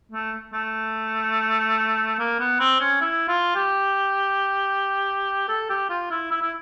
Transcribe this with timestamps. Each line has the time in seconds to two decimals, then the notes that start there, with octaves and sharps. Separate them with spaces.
0.12 A3
0.54 A3
2.19 A#3
2.40 B3
2.60 C4
2.80 C#4
3.01 E4
3.28 F4
3.56 G4
5.49 A4
5.70 G4
5.89 F4
6.11 E4
6.31 E4
6.42 E4